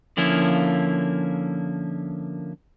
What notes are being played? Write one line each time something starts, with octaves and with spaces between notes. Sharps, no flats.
D3 F3 A#3 C#4 E4